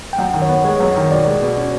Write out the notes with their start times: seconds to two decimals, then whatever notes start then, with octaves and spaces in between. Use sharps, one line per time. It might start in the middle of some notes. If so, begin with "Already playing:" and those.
0.13 G5
0.18 F#2 F#5
0.34 D#3
0.42 C#5
0.49 B3
0.64 G#3 C#5
0.80 F#2
0.96 D#3
1.11 B2 D5
1.27 G#3
1.42 B2
1.58 C#4